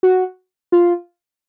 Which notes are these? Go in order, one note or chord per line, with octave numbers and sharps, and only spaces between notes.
F#4
F4